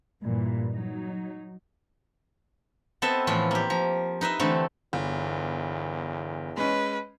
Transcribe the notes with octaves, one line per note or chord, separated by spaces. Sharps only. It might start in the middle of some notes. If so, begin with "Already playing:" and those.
G2 A#2 E3
F#3 D#4
B3 C4 A4 D#5 E5 A5
A2 E3 F3 F4
A#3 G4
F3 A#5
D#4 B4 D#5 E5
D3 E3 A3 C4
G1 E2
G#3 C#4 B4